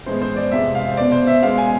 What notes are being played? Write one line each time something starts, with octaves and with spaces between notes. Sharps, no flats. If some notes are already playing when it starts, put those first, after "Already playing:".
A2 E3 G#3 B3 C5
C5
D5
F2 C3 F3 G#3 E5
F5
C5
B2 B3 D5
C5
E5
B2 G#3 B3 F5
G#5